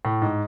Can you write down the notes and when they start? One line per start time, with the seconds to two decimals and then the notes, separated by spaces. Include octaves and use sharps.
0.05 A2
0.22 G#2